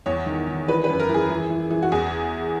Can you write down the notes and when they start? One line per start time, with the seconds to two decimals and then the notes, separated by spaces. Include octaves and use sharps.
0.06 E2 C#5
0.26 D#3
0.47 D#3
0.67 E3 B4
0.84 B4
0.89 F#2
1.00 A#4
1.09 E3
1.14 G#4
1.29 E3
1.50 E3
1.71 E3
1.83 F#4
1.92 E2 G#4